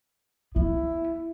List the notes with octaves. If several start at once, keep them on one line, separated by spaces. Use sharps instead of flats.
B3 E4